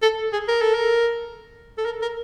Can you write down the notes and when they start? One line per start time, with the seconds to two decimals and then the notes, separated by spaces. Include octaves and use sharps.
0.02 A4
0.33 G#4
0.48 A#4
0.61 A4
0.74 A#4
1.78 A4
1.85 A#4
2.02 A#4